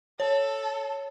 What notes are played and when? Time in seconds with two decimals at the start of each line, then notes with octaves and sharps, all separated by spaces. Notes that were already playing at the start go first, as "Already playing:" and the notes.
0.20 A4 C#5